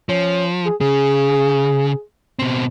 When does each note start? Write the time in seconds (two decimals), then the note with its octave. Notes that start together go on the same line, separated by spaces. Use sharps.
0.09 F3 C#4
0.65 G#4
0.81 C#3 G#4
2.39 B2 C4